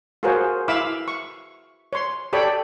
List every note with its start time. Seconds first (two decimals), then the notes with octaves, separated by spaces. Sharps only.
0.23 F4 F#4 G#4 A#4 C5 C#5
0.68 E4 E5 F5 B5 D6 E6
1.08 C#6
1.93 C#5 C6
2.33 G4 A4 C#5 D5 G5 B5